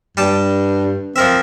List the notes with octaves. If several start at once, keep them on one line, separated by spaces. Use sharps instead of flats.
G2 G3 G5 A5
F3 C4 A#4 E5